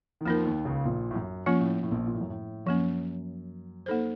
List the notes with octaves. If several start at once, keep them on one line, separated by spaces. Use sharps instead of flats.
D#3
F2 F3 A#3 D#4 A#4
D#2 D#3
C#2 C#3
A#1 A#2
A2
F#2
F3 A#3 C#4 F4
A2
A2
A#1 A#2
A#2
A2
F#2
A2
F#2 F3 A#3 C#4
A#3 D#4 A4 C5